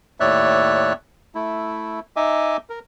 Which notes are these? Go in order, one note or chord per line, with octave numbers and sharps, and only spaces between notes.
D#2 A2 C#5 D5 E5 F#6
A3 E4
D#4 D#5 E5 G#5 D6
A#4